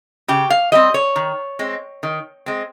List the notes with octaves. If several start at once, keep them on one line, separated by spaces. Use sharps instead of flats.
C#3 G4
F5
G3 C4 D#5
C#5
D#3
G#3 C4
D#3
G#3 C4